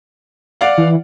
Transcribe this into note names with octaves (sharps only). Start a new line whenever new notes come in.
D5 F5 F#5
E3